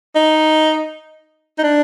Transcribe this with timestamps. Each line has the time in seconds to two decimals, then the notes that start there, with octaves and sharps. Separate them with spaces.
0.16 D#4
1.59 D#4
1.63 D4